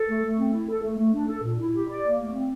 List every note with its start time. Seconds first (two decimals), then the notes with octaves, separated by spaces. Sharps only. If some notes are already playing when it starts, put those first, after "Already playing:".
Already playing: A4
0.08 A3
0.23 A3
0.38 C4
0.53 E4
0.69 A4
0.83 A3
0.98 A3
1.14 D4
1.28 A4
1.43 A#2
1.59 E4
1.73 G4
1.88 D5
2.04 A#3
2.19 A3
2.33 C4